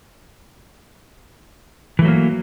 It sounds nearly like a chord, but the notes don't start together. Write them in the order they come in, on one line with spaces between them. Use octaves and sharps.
E3 A3 F#3 A#3